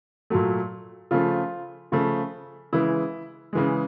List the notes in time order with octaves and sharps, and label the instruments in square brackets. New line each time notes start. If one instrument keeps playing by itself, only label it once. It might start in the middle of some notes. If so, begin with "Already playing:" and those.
[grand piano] A#2 F#3 A3
C#3 F3 A3 F4
C#3 F3 A3
C#3 E3 G#3 E4
C#3 E3 G#3